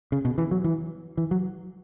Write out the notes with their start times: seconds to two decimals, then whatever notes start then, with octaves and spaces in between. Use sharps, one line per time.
0.12 C#3
0.25 B2
0.38 E3
0.51 F#3
0.64 E3
1.17 E3
1.31 F#3